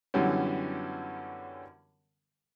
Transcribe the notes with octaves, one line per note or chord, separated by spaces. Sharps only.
F#2 D3 E3 G3 B3 C#4